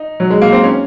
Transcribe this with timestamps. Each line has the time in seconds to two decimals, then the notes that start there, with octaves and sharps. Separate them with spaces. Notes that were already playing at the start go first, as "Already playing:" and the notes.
Already playing: D#4
0.20 F#3
0.30 G#3
0.42 A#3
0.52 C4
0.63 C#4